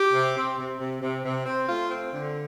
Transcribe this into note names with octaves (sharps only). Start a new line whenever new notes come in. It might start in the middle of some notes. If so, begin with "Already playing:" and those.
Already playing: G4
C3
C4
C3
C3
C3
C3
C4
A3 F4
C4
D3